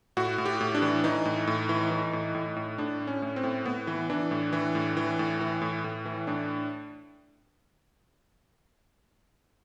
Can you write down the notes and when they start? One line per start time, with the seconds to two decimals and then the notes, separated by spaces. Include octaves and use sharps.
0.17 A2 F#4
0.38 A2
0.45 G4
0.61 A2
0.75 D4
0.82 E3
1.04 E3 D#4
1.25 A2
1.47 A2
1.69 E3
1.91 E3
2.13 A2
2.35 A2
2.56 A2
2.78 A2 D4
3.00 A2
3.07 C#4
3.22 A2
3.36 C4
3.43 A2
3.65 A2 B3
3.87 E3
4.10 E3 D4
4.31 A2
4.53 E3
4.75 A2
4.97 E3
5.19 A2
5.40 E3
5.62 A2
5.84 A2
6.05 E3
6.27 A2 D4